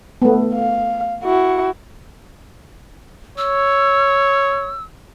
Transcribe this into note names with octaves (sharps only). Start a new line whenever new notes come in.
A3 B3
F5
E4 F#4
C#5 E6